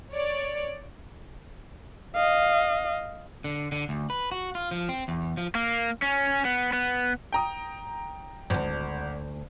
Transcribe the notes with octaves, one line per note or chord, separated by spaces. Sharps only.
C#5 D5
D#5 F5
D3
D3
D2
B4
F#4
F4
F3
C4
E2
F3
A#3
C#4
B3
B3
G5 A#5 D#6
G#1 D2 G#2